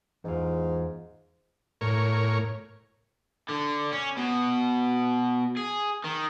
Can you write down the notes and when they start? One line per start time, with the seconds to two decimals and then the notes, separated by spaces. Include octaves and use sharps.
0.24 E2 G#2 F4
1.81 A2 A#4 C#5
3.50 D3
3.93 C#4
4.17 B2
5.57 G#4
6.04 D#3